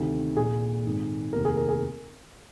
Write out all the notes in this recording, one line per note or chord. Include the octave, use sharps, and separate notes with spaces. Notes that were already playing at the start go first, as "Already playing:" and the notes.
Already playing: D2 C3 D#3
A#1 A#2 G#4
G#1 G#2 D#3
F1 D#2 D#3 A#4
G#4
A#4
G#4